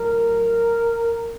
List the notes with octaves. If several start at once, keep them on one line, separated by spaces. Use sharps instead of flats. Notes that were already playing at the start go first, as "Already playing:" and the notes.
Already playing: A2 F#3 A#4